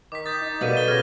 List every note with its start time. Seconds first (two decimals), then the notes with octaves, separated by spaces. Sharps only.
0.12 D#3 D6 B6
0.26 D#6 G6 A6
0.41 D#4
0.61 B2 A#3 B3 A4 D5 D#5 A6 D#7
0.74 D#7 G7
0.88 C#3 F6 G#6 A#6